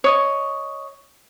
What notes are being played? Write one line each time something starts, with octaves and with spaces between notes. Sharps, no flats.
C#5 D#5 D#6